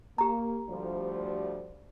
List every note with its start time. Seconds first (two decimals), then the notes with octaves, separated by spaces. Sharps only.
0.18 A#3 G4 A#5
0.69 D2 F3 G3